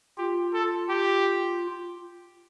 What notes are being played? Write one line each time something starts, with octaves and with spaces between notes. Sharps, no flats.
F4 G4
A4
G4